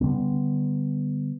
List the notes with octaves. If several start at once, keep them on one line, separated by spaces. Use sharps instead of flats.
D3 D#3 G3 B3